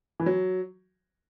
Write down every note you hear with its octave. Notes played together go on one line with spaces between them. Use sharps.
E3
F#3